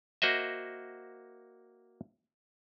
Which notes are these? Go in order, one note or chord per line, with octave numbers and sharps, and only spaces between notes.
A#3 F#4 C5 D#5 E5